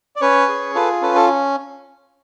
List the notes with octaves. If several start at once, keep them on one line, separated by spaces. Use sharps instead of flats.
D5
C#4 B4 C#5
G#4
F4 A4 B4
C#4 A4 B4
A4